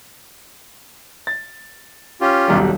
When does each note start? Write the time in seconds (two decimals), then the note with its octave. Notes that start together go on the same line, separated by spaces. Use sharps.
1.27 A6
2.21 C#4 F4 G4
2.48 D#1 B1 G3